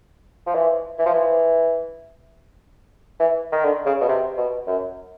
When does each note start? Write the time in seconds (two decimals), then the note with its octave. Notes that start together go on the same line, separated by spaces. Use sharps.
0.47 F3
0.55 E3
0.98 E3
1.06 F3
1.13 E3
3.20 E3
3.52 D#3
3.64 D3
3.86 C#3
4.01 B2
4.08 C3
4.37 B2
4.67 F#2